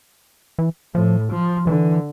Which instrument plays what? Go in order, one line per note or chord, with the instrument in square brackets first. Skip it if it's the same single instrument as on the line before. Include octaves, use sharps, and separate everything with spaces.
[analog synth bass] E3
[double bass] A2 [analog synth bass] F3
[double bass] F3
[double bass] D3 [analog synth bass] E3